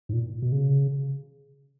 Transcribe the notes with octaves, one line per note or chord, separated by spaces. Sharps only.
G#2
A#2
B2
C#3